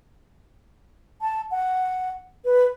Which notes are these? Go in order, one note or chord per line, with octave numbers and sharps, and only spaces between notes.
A5
F#5
B4